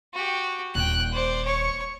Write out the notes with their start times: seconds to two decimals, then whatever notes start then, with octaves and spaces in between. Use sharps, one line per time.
0.14 F#4 G4
0.75 D#1 G5 F#6
1.12 C5 D5
1.45 C#5 C#6